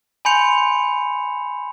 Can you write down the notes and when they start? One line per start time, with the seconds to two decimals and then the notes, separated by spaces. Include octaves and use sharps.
0.25 G#5 B5 C6 G6 C#7 F7